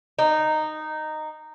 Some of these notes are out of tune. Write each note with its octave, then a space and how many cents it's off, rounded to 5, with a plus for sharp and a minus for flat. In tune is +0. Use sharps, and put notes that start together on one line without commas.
D#4 -10